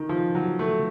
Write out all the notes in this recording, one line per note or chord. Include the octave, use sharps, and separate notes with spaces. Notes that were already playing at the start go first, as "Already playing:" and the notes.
Already playing: D#3
F3
F#3
A3